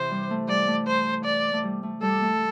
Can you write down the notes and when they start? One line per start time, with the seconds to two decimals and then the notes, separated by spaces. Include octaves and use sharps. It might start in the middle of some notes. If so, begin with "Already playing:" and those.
Already playing: C3 E3 C5
0.11 G3
0.30 A3
0.48 G3 D5
0.68 A3
0.87 C5
1.25 D5
1.53 A3
1.63 G3
1.83 A3
2.01 G3 A4
2.22 A3